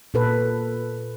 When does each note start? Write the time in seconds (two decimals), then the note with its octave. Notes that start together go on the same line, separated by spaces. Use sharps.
0.14 A#2 A4 B4